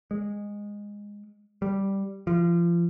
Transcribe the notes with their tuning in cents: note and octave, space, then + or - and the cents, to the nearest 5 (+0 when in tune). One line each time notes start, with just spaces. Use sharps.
G#3 -15
G3 -5
F3 -30